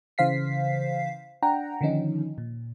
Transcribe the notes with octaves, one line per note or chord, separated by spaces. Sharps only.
C#3 E3 C5 F5 B6 C7
D4 F#5 G5 A#5
D3 D#3 F3 C#4 D#4
A#2